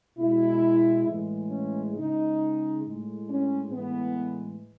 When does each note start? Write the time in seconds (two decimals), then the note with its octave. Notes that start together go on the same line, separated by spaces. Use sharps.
0.18 B2 G#3 E4
1.07 A2 E3 G#3
1.50 C#4
1.95 C#3 G#3 D#4
2.83 A2 G#3
3.28 C#4
3.71 A2 E3 G#3 B3